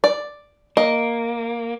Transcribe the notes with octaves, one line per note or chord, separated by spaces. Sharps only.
D5
A#3 D#5